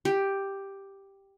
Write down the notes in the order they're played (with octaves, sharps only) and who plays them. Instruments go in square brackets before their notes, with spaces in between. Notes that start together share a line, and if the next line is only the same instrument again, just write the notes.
[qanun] G4